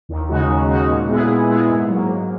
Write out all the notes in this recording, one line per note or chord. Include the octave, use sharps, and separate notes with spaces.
D#2
C#3 G#3 D#4 F#4
D#2
C#3 G#3 D#4 F#4
A#2
G#3 B3 E4 G#4
A#2
G#3 B3 E4 G#4
G#2
F#3 A#3
G#2